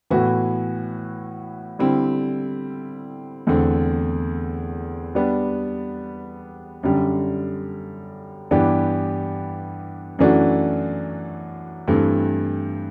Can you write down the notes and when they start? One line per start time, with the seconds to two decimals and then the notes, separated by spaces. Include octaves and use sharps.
0.10 A2 E3 B3 F#4 B4
1.79 D3 G3 C4 E4
3.47 E2 D3 A3 C4
5.15 G3 B3 D4
6.83 F#2 D3 G3
8.51 G2 E3 B3 D4 G4
10.19 F#2 E3 A3 D4 F#4
11.88 G2 E3 A3 C4